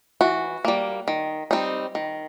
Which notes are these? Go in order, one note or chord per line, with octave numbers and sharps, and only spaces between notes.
E3 F#4
G3 A#3
D#3
G3 C4 D#4
D#3